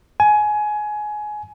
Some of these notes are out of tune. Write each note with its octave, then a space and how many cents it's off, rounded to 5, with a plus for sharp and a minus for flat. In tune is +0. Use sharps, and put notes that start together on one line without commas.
G#5 +20